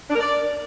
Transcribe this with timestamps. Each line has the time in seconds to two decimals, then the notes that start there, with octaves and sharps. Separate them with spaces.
0.10 D4
0.15 A#4
0.21 D5